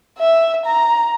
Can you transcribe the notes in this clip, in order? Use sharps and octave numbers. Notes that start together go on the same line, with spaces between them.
E5
A#5